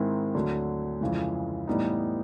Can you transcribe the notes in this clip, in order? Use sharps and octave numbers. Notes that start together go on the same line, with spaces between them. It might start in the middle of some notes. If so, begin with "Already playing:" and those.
Already playing: G#2 D#3 G#3 C4 E4
D2 D3 F#3
F2 C#3 E3 G#3
A2 E3 G3 B3 D#4